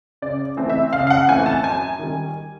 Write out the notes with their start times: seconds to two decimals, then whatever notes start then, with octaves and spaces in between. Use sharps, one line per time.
0.22 C#3 D5
0.57 E3 A3 C4
0.70 E5
0.93 C#3 F5
1.07 F5
1.10 F#5
1.28 E3 A3 C4 G#5
1.46 A5
1.64 F#2 G#5
1.99 D#3 G3